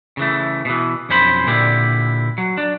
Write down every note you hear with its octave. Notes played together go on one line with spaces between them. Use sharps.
C#3 E3 A3
B2 E3
B1 F2 C#4 C5 B5
A#2 D3 E4 G4
F#3
D4